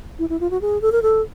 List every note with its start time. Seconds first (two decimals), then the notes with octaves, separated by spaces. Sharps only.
0.19 E4
0.29 E4
0.40 F4
0.51 F#4
0.61 G#4
0.82 A4
0.92 A#4
1.02 A4